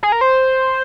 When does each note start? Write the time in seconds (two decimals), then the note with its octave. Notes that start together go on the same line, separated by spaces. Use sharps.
0.03 G#4
0.12 A#4
0.21 C5